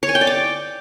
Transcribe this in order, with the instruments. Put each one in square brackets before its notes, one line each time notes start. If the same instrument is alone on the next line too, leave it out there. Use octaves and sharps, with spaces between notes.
[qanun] C#5
G#5
G5
D5
D6